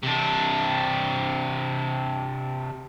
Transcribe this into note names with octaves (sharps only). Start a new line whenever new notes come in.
C3 D4